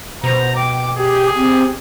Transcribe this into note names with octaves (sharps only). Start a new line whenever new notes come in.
B2 C5 A#5
G5 D6
G4 G#4
C4 G4